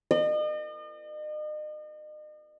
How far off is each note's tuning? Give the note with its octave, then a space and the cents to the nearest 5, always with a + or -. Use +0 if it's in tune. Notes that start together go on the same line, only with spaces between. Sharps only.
D#5 -40